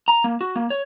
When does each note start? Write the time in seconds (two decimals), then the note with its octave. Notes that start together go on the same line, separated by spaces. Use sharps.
0.08 A#5
0.24 A#3
0.41 F#4
0.56 A#3
0.70 C#5